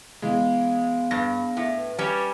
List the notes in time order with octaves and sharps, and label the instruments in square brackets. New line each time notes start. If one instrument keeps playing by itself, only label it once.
[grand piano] E3 G#3 [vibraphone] B3 G#4 F5
[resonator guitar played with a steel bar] G2 [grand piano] A#6
[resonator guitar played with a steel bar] A2
[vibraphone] B4
[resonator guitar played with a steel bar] G3 C#4 [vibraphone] B4